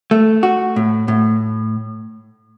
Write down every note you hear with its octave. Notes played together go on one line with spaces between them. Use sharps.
A3
F#4
A2
A2